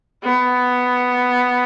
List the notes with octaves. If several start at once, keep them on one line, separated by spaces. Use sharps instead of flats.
B3